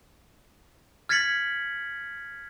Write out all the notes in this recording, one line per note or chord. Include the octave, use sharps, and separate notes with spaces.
F6 G#6 A6 B6 C#7 F#7